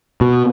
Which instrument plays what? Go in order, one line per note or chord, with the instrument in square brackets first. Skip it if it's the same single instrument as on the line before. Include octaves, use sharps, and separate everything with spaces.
[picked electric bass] B2